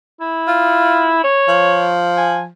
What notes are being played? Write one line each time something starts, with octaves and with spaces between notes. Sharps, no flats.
E4
F4
C#5
F3
G#5